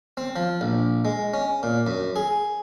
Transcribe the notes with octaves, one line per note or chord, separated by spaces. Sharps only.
C4
F3
A#1
G#3
C#4
A#2
F#2
G#4